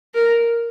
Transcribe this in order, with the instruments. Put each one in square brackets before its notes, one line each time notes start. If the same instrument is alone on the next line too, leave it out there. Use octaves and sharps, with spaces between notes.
[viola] A#4